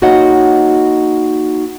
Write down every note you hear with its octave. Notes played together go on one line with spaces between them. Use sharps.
A#3 D#4 F#4 C#5 D#5 F#5